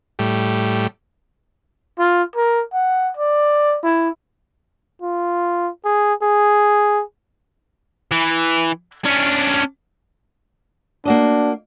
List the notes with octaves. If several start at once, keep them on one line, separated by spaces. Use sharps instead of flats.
A2 G3
F4
A#4
F#5
D5
E4
F4
G#4
G#4
E3
C#4 D4
A#3 D4 F#4 D#5